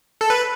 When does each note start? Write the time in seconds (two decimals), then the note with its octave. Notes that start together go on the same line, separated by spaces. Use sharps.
0.21 A4
0.30 B4